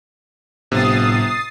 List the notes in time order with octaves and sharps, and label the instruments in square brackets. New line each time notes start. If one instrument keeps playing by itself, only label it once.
[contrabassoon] G1 [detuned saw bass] A2 [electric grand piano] C3 [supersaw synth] D#6 A6 C7